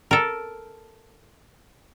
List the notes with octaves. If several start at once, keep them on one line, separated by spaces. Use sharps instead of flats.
A4 A#4